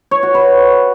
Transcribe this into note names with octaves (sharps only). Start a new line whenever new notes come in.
C#5
F#4
B4